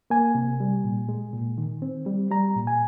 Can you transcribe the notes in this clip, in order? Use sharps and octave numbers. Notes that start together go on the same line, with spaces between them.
A#3 G#5
C3
G3
A#2
G#3
A#2
D#3
C4
G3
G3 A#5
A#2
G#5